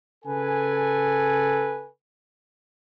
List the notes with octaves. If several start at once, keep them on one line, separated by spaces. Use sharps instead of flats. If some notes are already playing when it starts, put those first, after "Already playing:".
C#3 A4 B4 G#5